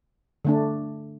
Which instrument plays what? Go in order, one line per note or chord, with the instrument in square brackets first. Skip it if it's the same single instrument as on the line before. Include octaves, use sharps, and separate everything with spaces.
[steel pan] D3 A3 D4